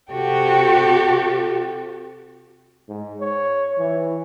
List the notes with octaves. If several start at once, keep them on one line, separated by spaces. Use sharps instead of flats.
C3 F#4 G4 A4 G5
G#2
C#5
E3